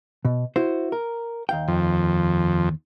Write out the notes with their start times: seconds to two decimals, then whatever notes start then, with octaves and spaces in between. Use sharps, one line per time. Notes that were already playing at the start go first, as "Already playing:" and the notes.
0.25 B2
0.56 E4 F#4 C5
0.92 A#4
1.49 D#2 F5 G5
1.68 F2